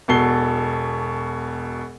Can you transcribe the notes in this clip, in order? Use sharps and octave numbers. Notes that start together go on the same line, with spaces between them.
E1 B2 A4 C7 G7